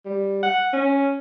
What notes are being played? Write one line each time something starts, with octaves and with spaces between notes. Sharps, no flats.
G3
F#5
C#4